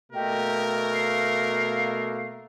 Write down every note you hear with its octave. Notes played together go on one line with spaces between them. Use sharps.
B2 A3 A#3 G4 A#4 D#5
F5